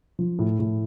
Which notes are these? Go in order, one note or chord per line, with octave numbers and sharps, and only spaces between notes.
F3
A2
A2